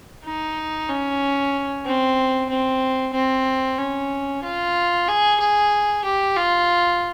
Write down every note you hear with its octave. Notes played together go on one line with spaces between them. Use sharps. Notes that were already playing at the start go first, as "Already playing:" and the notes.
D#4
C#4
C4
C4
C4
C#4
F4
G#4
G#4
G4
F4